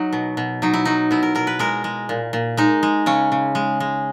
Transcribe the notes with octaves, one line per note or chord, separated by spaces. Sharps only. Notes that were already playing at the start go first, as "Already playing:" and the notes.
Already playing: F#3 D#4
B2
B2
F#3 D#4
E4
F#3 D#4
B2 E4
A#4
B2 A#4
B4
G#3 A#4
G#3
A#2
A#2
G#3 D#4
G#3
C#3 C#4
C#3
G#3
G#3